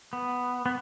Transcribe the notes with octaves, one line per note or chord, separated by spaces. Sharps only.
B3
B3